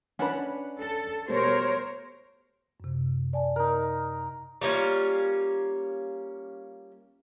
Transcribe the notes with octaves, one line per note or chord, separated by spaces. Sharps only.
C#4 D4 B4 F#5 B5
A4
B2 G3 A3 A#4 C5 C#5
F#2 C3
D5 G#5 A5
D#4 A#4
G3 A#3 C#4 F4